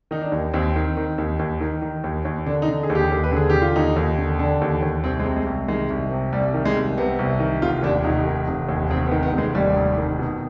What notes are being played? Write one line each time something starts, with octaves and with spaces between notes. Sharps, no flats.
D#3 D#4
D4
D#2
D#2 C4
D#3
D#3
D#2
D#2
D#3
D#3
D#2
D#2
D3 D4
D#4
D3
G#4
D#2
G4
D#2
B4
D3 G#4
D3 G4
F4
D#2 D#4
D#2
D3
D3 D4
D#2
D#2
C2 C4
G#3
C3
G#3
C2
D#3 G#3
C2
C3
C2 G3
D#3
G#3
C2
C3 B3
C2
D#3
F1 F4
D#2 D4
F1 D#4
D#3
F1
D#2
F1 C4
B3
D#3
B3
F1
G#3
D#2 G3
F1
D#3
B2